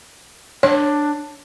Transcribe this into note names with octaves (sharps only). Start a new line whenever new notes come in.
D4 C#5